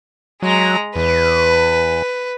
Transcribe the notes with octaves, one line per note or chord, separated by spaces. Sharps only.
F#3 G#3 A#5
E2 B4